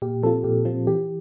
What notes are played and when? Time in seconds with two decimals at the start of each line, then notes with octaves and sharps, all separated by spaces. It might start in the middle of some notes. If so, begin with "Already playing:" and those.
0.02 A#2 G4
0.23 F3 C4 F4 A4
0.44 A#2 G4
0.65 F3 C4 F4
0.87 E3 G4